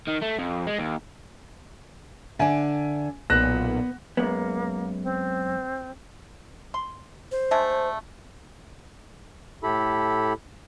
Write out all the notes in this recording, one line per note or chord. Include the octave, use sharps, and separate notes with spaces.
D#3
A3
F2
G#3
D#2
D3 D4 E5 G#5
B1 A#2 B3 F#6 A#6 E7
F#2 G#3 A#3 B3
C4
C6
C5
G#3 A3 D4
A2 E4 G4 A4 B5